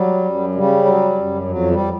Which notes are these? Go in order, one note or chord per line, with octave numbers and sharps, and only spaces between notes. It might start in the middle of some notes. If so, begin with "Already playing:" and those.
Already playing: F#3 G3
F#2
C#3 G3
F#3
F#2
F2 F#3
G3